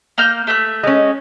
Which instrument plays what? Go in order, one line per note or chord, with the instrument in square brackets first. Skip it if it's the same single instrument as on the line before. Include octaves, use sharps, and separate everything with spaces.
[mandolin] A#3 F6 G6
A3 E5 F#6
[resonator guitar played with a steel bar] G#3 C#4